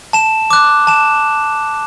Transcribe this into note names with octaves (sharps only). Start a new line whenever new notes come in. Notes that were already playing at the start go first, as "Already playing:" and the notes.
A5 E7
D6 F#6
A5 E7